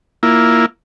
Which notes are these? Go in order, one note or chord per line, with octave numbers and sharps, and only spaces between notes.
A#3 E4 F4